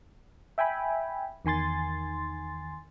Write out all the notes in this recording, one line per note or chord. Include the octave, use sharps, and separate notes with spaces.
E5 G5 G#5 B5
E2 D#3 G#5 C6 A6